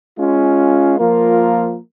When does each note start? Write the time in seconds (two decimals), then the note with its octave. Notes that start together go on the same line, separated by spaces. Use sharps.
0.18 G#3 C#4 F4
0.98 F3 A#3 F4 A#4